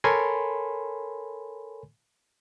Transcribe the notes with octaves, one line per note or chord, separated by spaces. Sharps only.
A4 A#4 C#5 G#5 B5 C6